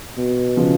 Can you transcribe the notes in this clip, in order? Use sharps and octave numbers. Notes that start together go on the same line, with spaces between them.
B2
C#3 F3